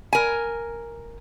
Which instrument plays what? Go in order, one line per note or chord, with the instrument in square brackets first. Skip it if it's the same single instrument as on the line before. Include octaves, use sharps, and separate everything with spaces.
[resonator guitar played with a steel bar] A#4 G#5